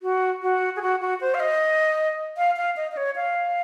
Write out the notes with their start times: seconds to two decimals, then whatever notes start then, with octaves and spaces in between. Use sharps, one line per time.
0.03 F#4
0.42 F#4
0.76 G#4
0.82 F#4
1.01 F#4
1.21 C5
1.34 F5
1.40 D#5
2.37 F5
2.57 F5
2.77 D#5
2.92 D#5
2.97 C#5
3.16 F5